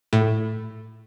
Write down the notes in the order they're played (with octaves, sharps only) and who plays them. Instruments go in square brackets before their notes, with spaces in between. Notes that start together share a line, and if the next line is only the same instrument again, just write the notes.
[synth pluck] A2